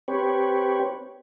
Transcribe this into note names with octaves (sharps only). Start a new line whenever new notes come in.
C4 G4 B4 C#5